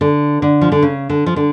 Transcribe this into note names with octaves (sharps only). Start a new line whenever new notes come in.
D3
D3
F3
D3
C#3
D3
F3
D3